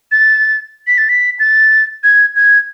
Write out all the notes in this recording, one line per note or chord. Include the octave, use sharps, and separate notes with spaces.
A6
B6
A6
B6
A6
G#6
G#6